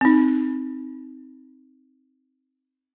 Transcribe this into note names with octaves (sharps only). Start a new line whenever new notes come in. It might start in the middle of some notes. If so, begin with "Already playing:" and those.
C4 D#4